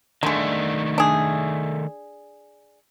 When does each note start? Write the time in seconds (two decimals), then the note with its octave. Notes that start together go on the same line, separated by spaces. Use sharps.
0.23 D3 D#3 G#3 A3
0.98 D4 G#4